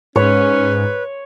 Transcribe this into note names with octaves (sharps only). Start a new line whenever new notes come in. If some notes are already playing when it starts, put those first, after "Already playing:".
G#2 C#4 B4 C#5